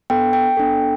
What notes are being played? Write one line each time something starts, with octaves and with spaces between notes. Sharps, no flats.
B3 D4 A4 G5
G5
B3 D4 A4